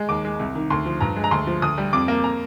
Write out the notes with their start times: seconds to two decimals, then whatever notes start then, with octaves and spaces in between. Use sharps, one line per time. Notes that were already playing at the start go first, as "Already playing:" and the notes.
Already playing: G#3
0.09 D#2 D6
0.25 G#3
0.39 C2
0.55 D#3
0.70 D2 C6
0.86 F3
1.00 G2 A#5
1.16 G#3
1.24 A#5
1.31 D2 C6
1.47 F3
1.62 D2 D#6
1.78 G3
1.93 F2 D6
2.08 A#3
2.24 A#5